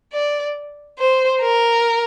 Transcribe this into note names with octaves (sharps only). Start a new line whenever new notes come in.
D5
C5
A#4